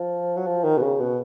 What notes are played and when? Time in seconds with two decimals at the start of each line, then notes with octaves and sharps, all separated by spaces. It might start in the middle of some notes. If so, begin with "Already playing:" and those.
Already playing: F3
0.36 F#3
0.46 F3
0.64 D#3
0.77 B2
0.82 C#3
1.00 B2